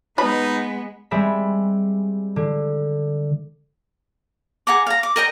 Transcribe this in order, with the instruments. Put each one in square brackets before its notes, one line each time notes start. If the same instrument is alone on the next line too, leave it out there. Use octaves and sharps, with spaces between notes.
[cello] G#3 B3 [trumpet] D#4 [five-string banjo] B4 B5
[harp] G3 G#3 C4 G#4 E5 B5
D3
[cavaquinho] G#4 F#5 A#5 D6
F5 A#5
D6
A#4 D#5 G5 A#5